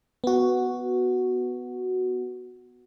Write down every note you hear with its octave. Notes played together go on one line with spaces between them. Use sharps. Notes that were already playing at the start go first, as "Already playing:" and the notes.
B3 F#4